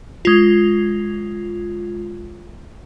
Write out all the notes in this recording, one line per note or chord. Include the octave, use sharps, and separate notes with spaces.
G#3 F4